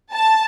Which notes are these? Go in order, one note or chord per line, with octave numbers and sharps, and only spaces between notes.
A5